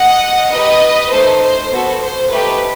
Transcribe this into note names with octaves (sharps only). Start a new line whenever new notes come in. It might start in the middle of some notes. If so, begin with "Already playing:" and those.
Already playing: D#5 F#5
D#4 G4 B4 D#5
A3 D#4 A4 C5
C5
B3 F#4 A4
C5
A3 D#4 G4 B4